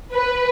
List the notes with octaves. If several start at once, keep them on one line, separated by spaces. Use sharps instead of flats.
B4